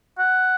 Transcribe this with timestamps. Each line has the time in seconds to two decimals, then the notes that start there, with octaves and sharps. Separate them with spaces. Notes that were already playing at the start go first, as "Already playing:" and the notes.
0.19 F#5